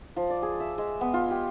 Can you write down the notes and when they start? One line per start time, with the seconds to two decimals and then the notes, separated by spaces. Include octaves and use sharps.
0.16 F3
0.30 D5
0.43 G#4
0.60 E5
0.78 G#3
1.01 B3
1.14 F4
1.31 G4